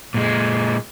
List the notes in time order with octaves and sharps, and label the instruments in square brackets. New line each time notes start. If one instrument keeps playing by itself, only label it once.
[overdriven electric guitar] A#2 G#3